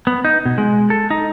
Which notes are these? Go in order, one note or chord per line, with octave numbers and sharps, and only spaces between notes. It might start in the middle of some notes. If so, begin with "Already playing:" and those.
B3
D#4
B2
G#3
A4
D#4